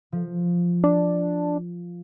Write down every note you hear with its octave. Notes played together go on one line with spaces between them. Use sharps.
F3
D4